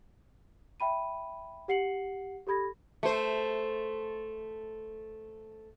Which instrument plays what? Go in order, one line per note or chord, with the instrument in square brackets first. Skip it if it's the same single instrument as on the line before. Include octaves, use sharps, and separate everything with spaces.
[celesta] E5 G5 B5 D#7
G4 F#5 C7 C#7 F#7
G4 A4 B5 G#6 A#6
[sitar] A3 C5